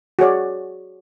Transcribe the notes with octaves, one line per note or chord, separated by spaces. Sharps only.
F#4 G#4 C#5 D5